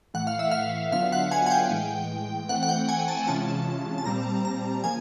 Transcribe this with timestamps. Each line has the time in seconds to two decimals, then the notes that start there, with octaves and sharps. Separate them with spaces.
0.14 A2 E3 A3 F#5
0.27 F5
0.39 E5
0.51 F5
0.92 D3 F#3 B3 D4 F4 F5
1.12 F#5
1.31 G#5
1.46 G#5
1.51 G5
1.71 A2 E3 G#3
2.49 E3 A3 C4 F#5
2.63 F#5
2.69 G5
2.89 G#5
3.08 A5
3.27 C3 E3 G#3 C#4 F4 A5
3.98 A5
4.05 A#2 G3 C4 A#5
4.45 A#5
4.84 C#3 F3 A#3 G#5